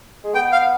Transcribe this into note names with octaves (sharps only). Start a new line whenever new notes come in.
G#3
B3 G5
F5